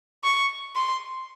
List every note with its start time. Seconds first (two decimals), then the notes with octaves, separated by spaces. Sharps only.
0.24 C#6
0.76 C6